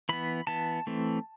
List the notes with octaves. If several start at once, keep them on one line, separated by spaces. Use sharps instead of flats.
E3 B3 B5
E3 B3 A5
E3 A3 C4